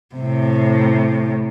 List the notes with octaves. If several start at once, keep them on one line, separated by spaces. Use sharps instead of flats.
A2 C3